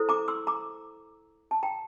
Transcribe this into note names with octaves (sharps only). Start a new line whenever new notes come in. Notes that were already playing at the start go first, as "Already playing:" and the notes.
Already playing: E4 A4 C5
A#5 D6
C6 E6
A#5 D6
A5
G5 A#5